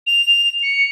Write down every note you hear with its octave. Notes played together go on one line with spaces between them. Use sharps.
F7
C#7